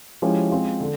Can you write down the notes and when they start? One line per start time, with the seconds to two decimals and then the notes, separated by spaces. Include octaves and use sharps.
0.22 F3 G#3 C#4 E4 G4
0.51 G#3 C4 F4
0.80 D3